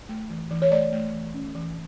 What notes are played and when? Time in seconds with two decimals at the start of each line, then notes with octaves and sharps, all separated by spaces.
0.09 A3
0.30 E3
0.51 E3
0.62 C#5
0.71 A3 D5
0.92 A3
1.13 E3
1.34 C#4
1.55 E3